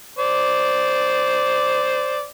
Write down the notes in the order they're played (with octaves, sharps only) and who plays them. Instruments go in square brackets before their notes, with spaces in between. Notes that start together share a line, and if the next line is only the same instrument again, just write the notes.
[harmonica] C5 D5